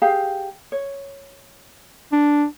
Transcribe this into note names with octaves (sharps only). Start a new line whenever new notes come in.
G4 G#4 F5
C#5
D4